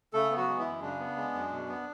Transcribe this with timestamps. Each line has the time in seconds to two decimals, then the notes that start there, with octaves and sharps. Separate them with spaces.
0.13 C#3 A3 A4
0.31 B3
0.37 F#3 F#4
0.48 G#3
0.59 E3 E4
0.65 F#2
0.82 C#3 D4
0.99 B3
1.17 G#3
1.34 F#2
1.51 B2
1.68 B3